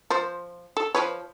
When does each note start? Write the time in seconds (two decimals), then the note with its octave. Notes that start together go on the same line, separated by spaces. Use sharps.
0.10 F3 F4 C5
0.77 A4
0.95 F3 B4 C#5